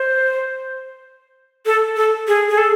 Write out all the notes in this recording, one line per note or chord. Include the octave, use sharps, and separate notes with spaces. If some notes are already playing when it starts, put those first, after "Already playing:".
Already playing: C5
A4
A4
G#4
G#4
A4